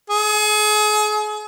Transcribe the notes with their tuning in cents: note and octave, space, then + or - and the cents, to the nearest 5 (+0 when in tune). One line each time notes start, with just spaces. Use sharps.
G#4 +35